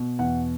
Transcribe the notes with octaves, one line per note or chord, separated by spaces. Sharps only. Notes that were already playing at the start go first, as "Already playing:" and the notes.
Already playing: B2
E2 F#5